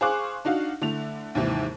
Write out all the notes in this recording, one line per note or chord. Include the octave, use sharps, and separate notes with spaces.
G#4 C5 F5 C#6 D6 F#6
D4 D#4 F#4 F5
D3 A3 E4 F7
D#2 G#2 C3 D#3 E3